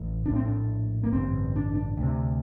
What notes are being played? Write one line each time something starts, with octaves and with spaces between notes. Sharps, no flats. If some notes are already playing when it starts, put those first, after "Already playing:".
Already playing: A1 A2
A#1 A2 D4
C4
D4
A#3
A1 G2 D3 C4
D4
D4
D2 C3